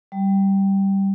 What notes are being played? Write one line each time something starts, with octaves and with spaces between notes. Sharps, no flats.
G3